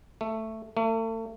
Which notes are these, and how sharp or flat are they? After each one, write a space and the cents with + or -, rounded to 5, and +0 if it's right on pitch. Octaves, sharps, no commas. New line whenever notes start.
A3 +10
A3 +40